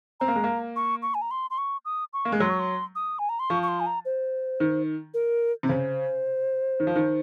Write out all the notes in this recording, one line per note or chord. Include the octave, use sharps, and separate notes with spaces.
C4 A#5
A#3
G#3
A#3
C#6
C#6
G#5
A#5
C6
C6
C#6
D#6
C#6
A#3
G#3
F#3 C6
C#6
C6
D#6
G#5
A#5
C6
F3 C#6
C#6
C6
G#5
A#5
C5
D#3
A#4
C3
C#3 C5
D#3
F3
D#3